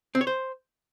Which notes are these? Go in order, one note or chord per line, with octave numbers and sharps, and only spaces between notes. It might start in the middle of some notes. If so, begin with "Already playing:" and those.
C4
C#5
C5